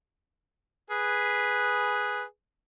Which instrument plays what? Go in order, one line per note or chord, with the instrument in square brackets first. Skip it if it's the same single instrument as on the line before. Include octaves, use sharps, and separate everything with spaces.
[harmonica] G#4 B4